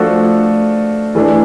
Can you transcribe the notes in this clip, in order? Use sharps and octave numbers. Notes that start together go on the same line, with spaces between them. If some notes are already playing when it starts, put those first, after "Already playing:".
Already playing: F3 A3 D4 F#4 A4
E3 A3 D4